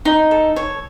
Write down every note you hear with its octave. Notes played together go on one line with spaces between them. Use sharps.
D#4
A4
C#5